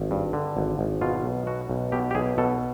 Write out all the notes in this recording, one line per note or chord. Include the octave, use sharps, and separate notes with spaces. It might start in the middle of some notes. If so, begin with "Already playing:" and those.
Already playing: G#1
G2
D3
G#1
G#1
B2 F4
B1
B2 F#4
B1
B2 G4
G4
B1 G#4
B2 A4